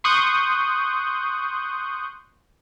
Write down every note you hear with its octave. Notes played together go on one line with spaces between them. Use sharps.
C6 C#6 D#6 F#6 G6